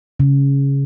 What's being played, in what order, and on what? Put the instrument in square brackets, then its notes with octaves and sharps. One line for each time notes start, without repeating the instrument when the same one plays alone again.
[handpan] C#3